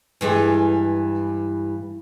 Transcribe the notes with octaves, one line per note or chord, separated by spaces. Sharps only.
G2 E3 G#3